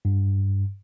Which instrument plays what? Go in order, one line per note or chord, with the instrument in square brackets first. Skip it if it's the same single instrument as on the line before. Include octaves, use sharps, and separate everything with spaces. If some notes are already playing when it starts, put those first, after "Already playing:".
[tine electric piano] G2